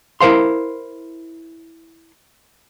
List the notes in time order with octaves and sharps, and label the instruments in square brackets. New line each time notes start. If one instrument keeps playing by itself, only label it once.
[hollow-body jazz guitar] E4 A#4 C5 F5 C6